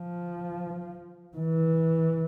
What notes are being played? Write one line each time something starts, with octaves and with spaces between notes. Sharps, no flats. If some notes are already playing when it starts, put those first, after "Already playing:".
Already playing: F3
E3